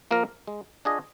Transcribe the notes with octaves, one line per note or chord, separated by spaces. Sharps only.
F3 A#3 F4 A#4
G#3
D4 F4 G#4 D#5